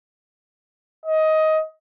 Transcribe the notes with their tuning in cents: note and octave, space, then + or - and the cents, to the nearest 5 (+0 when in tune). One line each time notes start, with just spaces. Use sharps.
D#5 +15